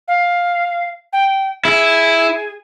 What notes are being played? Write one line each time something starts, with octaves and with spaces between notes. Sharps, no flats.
F5
G5
E4 G#4